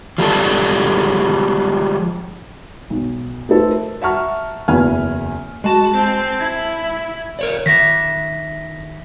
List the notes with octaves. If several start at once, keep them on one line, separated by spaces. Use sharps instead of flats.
F3 G3 G#3 A4
B1
A3 D#4 A4 B4 C5
A#4
E5 F#5 A5 A#5 C#6 F6
F#1 E2 E4 B4 G#5 F6
G#3 F#4 A5
C4
E4 G#6
A#4 C#5 D5
D#3 E5 A#6 B6